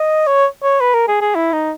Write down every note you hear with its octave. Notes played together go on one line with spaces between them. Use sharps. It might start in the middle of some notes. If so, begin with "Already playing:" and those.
Already playing: D#5
C#5
C#5
B4
A#4
G#4
G#4
E4
D#4